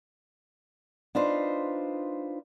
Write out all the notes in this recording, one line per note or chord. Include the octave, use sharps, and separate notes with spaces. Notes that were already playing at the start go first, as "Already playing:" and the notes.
D4 D#4 F4 B4 C5